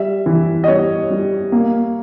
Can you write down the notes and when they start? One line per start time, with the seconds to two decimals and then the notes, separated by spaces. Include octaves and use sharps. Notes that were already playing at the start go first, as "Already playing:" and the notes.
Already playing: G3 E5
0.26 E3
0.64 D#5
0.67 G3 C#5
1.11 G3
1.52 A#3